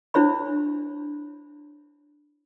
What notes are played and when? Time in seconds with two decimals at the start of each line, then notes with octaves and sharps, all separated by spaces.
0.14 D4 E4 C5 C#5 B5